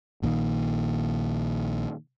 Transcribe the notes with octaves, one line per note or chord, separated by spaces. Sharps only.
A#1 A#2 D3 D#3